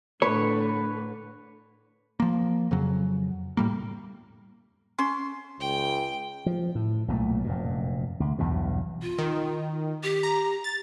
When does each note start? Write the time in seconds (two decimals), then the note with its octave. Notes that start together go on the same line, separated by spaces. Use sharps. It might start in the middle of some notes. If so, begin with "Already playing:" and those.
0.22 A2 D3 B4 C#5
2.20 F3 A#3
2.71 F2 C#3 F#3
3.57 A2 G3 A#3
4.99 C#4 C6
5.60 C#2 G5
6.46 F3
6.75 A2
7.08 B1 A#2 F#3 A3
7.44 F1 F#2 A#2
8.20 D2
8.38 B1 E2 G2 B2
9.02 F4
9.18 D#3
10.03 G4
10.23 A#5
10.64 A6